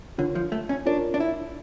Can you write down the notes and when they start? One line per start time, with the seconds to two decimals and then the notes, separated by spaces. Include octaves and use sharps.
0.18 D3 F4 A#4 C#5
0.35 F3
0.52 A3
0.69 C#4
0.86 D4 F4 A#4 C#5
1.14 D4
1.20 E4